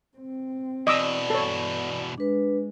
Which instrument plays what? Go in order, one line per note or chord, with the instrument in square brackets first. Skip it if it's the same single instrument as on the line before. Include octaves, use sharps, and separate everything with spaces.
[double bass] C4
[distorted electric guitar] E2 B2 [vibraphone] D5 [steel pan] D#5 D6 E6
[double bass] G2 [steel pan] A4 C#5
[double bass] G#3 [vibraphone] D4 B4